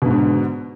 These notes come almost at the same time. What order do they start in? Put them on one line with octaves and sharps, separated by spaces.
B2 G#2 D3